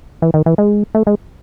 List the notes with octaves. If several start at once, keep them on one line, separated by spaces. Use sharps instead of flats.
E3
D#3
E3
G#3
A3
G#3